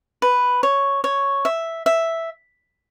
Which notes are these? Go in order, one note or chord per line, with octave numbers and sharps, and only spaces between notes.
B4
C#5
C#5
E5
E5